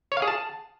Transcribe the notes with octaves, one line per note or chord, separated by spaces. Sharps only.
C#5
F5
G#4
A5